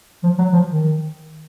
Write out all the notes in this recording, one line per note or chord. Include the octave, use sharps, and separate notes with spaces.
F3
F#3
F3
D#3